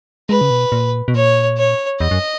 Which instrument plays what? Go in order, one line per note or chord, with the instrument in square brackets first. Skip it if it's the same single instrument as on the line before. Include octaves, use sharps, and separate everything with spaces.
[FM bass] G#3 [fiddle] B4
[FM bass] C#3
B2
A#2
B2
[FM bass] A#2 [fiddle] C#5
[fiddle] C#5
[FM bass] E2 [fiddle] D#5
[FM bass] F#2